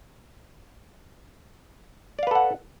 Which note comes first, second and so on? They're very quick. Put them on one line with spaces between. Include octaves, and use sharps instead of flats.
D5 F5 B4 A4 F#5